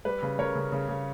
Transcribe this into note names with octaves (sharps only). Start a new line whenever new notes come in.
G3 B4
C#3
C#3 A#4 C#5
C#3
C#3
C#3